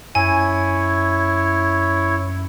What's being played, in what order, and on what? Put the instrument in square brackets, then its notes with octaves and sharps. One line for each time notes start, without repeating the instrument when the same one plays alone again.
[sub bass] F#2 [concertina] E4 C#5 [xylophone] G#5